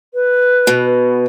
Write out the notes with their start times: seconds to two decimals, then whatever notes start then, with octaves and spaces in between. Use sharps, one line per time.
0.14 B4
0.67 B2